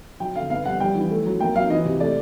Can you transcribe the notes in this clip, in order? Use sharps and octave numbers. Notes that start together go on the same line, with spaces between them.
F#3 G5
D3 F5
B3 F5
G3 F#5
G3 G5
E3
A3
F#3
A#3 G5
F#3 F5
E3 D#5
C3
A3 D5